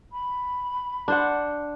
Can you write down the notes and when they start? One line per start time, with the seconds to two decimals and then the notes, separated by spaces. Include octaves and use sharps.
0.12 B5
1.08 D4 C5 F#5